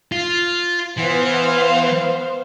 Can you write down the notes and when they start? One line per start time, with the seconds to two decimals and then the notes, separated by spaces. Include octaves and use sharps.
0.12 F4
0.98 E3 B3 C5 F5